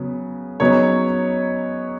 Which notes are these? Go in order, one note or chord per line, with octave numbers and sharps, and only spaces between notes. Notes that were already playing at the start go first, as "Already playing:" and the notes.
Already playing: C#3 F#3 B3
C#3 F#3 B3 D#4 C#5